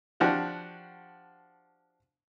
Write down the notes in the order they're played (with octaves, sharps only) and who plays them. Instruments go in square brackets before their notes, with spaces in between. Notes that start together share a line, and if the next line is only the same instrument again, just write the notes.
[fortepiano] F3 D4 F#4 G4